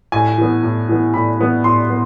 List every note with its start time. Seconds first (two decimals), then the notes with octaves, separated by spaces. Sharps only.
0.12 A2 G#5
0.38 E3 B3
0.63 A2
0.89 E3 B3
1.14 A2 B5
1.40 E3 B3
1.64 A2 C6
1.90 B3